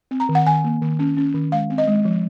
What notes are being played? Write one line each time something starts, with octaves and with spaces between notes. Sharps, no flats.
C4
A#5
D#3
F#5
D#3 G#5
A#3
D#3
C#4
C#4
D#3
G#3 F5
C4
D#5
G#3
F3